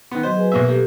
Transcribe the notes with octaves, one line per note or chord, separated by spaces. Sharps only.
D#3 B3
F#3 F#4 C5 D#5
G#4 B4 G#5
B1 A#3 E5
G4 A4